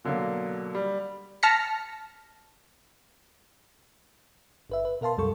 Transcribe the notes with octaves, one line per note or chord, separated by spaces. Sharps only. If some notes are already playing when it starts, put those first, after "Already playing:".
B2 D3 F#3 A#3
G3
A5 F6 A#6 B6 C#7
G1 B4 E5
B4
B2 A#4 F5 A5 C6
C2 F#2 G3 A4 C#6